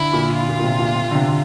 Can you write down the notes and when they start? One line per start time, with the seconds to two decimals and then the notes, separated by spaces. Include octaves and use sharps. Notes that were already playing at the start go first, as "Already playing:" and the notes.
Already playing: D3 E4
0.13 A#2
0.34 F4
0.49 A#2
0.59 A#2
0.64 C3
0.79 A#2
0.95 C3
1.11 D3
1.15 C3